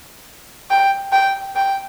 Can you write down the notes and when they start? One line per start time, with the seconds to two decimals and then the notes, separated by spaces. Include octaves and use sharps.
0.70 G5
1.12 G5
1.56 G5